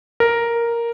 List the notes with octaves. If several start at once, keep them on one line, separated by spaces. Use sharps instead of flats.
A#4